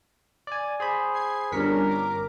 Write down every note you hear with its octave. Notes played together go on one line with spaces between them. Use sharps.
D5 G#5
G#4 C5 B5
G#6 C7
G1 G3 C#4 D4 A#4 B6 C#7
D6